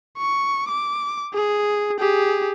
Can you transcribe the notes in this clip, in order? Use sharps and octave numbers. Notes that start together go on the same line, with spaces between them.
C#6
D6
G#4
G4 G#4